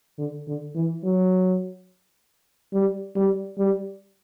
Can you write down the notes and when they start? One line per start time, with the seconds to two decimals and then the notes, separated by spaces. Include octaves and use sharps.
0.18 D3
0.47 D3
0.75 E3
1.04 F#3
2.73 G3
3.16 G3
3.58 G3